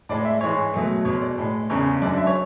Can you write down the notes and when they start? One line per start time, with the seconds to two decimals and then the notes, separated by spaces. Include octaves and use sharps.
0.09 A2 G#3 D5
0.25 E5
0.41 G#2 E3 G#3 C#5
0.74 B2 F#3 A3
1.05 B2 G#3 C#5
1.21 D5
1.38 A2 G#3
1.70 E2 C#3 G#3 C#5
2.02 F#2 D3 G#3 D5
2.17 E5
2.27 C#5